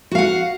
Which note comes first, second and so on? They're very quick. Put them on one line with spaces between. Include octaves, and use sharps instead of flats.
F#4 F5 F#5